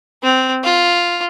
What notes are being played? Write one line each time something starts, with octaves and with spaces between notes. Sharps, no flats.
C4
F4